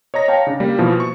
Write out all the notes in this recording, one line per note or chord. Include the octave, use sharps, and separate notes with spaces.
C#5 D#5 A#5 A#6
C#5 F5 G5 A5
C#3 D4
G3 A#3
B2 E3 F3 A#3
C#6